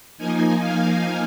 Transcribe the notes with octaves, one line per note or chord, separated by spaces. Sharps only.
F3 A#3 D#4 G#5
F5